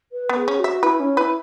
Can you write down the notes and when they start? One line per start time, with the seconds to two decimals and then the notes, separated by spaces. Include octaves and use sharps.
0.12 B4
0.29 B3
0.35 G#4
0.48 C#4
0.59 F#4
0.64 E5
0.82 E4 B4
0.99 C#4
1.17 E4 B4